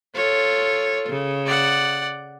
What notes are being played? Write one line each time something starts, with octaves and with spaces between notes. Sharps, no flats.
F4 A4 C#5
C#3
D5 F#5